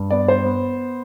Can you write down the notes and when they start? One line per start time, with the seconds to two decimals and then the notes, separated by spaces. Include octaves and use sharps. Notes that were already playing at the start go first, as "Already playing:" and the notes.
Already playing: G2
0.10 B3 D5
0.28 C5
0.45 B3